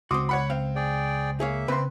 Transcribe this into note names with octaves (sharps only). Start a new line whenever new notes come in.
C#2 C4 F#4 C6 D6 D#6
C#5 F#5 B5
C4 F5
G#4 D5 G5
A#3 G#4 C#5 E5 F5
C#3 C4 B4 C6